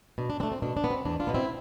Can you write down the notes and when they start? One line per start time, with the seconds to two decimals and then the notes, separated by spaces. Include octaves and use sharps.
0.18 B2 D4
0.30 D4
0.40 A3 C4 D4
0.52 C4
0.62 B2 D4
0.77 D4
0.84 B3
0.90 C4
1.05 E2 D4
1.20 D4 F4
1.27 B2 B3
1.34 C4 E4